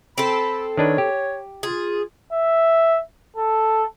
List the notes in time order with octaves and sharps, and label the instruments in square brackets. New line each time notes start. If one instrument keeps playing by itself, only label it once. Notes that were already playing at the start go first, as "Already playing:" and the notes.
[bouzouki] C4 A4 [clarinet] B5
[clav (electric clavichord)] D#3 D4 B4 [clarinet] C#5
[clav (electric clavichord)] G4
[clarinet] F4 [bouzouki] G#4
[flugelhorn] E5
A4